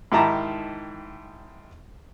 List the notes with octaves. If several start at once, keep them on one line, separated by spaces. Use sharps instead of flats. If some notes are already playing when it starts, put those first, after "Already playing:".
G#2 D#3 E4 G4 A5 A#5